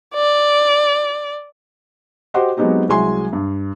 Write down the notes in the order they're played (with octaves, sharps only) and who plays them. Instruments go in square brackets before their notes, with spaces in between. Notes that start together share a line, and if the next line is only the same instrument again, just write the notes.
[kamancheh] D5
[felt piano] F#4 G4 C5 D#5 F#5 C6
F#3 G#3 B3 C4 D#4 G4
C2 F#3 G#3 G#5 C6
G2